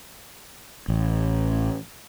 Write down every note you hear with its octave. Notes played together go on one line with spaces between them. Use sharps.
A1